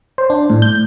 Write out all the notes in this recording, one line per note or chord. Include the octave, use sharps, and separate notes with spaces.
C5
D4
A2
G6